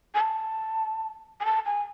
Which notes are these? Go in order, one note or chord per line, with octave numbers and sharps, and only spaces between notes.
G#5
A5
G#5
A5
G#5